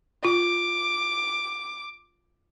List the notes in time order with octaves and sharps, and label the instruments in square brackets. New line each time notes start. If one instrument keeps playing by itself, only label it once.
[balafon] F4 [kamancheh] D6